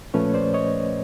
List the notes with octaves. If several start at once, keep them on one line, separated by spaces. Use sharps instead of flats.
A#2 F3 A3 C#4 B4 C#5
C5 D5
C#5 D#5